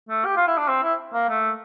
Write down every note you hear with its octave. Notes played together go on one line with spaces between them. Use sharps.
A3
G4
F4
E4
D4
C4
E4
A#3
A3